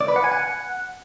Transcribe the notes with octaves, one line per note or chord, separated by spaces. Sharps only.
D5
B4
F#5
G#5
F#5